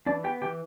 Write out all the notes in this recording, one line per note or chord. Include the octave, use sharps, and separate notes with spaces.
E3 D4 D5
B3 G4 G5
E3 G4 G5